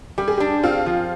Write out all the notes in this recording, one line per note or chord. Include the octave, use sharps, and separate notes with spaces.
G3 G4
G#4
D4 G4
C4 F4
F3